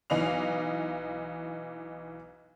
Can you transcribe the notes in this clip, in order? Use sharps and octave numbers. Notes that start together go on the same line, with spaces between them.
B1 E3 D#4 D#5 F5 F7